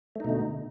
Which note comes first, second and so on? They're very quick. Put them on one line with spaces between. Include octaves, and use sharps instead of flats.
A3 D#4 B2 D3